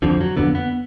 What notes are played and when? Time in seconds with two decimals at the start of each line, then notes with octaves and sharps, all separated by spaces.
0.02 F2 D3 F3
0.21 F#3
0.37 F2 D3 B3
0.55 B3